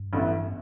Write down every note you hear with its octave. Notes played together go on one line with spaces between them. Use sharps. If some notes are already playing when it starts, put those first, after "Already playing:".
Already playing: G2
A1 A2 E3 B3 E4